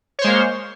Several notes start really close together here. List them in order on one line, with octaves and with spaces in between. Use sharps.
C#5 C5 G#3 A#3